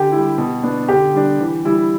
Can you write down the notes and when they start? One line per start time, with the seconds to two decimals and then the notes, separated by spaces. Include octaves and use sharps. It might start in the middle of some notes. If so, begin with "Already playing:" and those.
Already playing: D3 G4
0.12 G3 E4
0.38 B2
0.63 B3 D4
0.88 D3 G4
1.14 G3 D4
1.40 E3
1.65 G3 E4